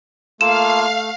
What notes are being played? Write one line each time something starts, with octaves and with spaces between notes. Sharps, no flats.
A3 A#3 F4 A4 F5 E7